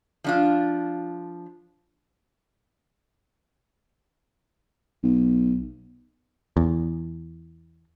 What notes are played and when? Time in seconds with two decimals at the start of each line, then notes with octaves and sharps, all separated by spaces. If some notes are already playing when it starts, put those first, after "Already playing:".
0.24 F3 D4 F4
5.03 B1
6.57 E2